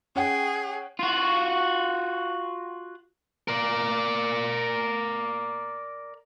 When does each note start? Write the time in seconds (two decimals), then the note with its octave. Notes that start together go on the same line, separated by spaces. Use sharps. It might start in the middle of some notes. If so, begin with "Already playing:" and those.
0.16 C#4 G#4 F#5 G5
0.99 F4 F#4
3.48 A#4 D5